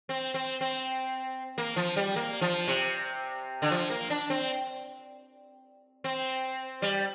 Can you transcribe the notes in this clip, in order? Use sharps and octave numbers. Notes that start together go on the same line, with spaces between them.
C4
C4
C4
A#3
F3
G3
A#3
F3
C3
D3
F3
A#3
D4
C4
C4
G3